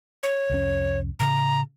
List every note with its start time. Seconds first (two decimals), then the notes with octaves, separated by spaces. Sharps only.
0.23 C#5
0.50 C2 F2 C#4
1.20 A2 C#3 A#5